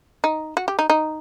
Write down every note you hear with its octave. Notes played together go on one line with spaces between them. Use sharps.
D#4
F#4
G4
D#4
D#4